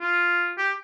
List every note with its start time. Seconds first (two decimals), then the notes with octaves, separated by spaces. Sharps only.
0.01 F4
0.58 G4